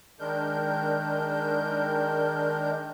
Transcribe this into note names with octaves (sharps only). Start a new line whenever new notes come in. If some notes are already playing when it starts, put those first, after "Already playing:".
D#3 G#3 D4 A#4 G6